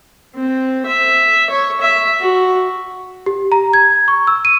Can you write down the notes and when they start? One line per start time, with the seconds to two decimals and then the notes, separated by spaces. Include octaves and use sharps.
0.35 C4
0.86 E5
1.50 C#5
1.80 E5
2.19 F#4
3.26 G4
3.52 A#5
3.73 G#6
4.08 C#6
4.27 E6
4.45 D#7